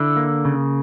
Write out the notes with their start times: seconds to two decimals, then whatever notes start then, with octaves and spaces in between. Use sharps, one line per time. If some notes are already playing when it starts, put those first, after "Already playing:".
Already playing: D3 E4
0.16 A#3
0.45 C#3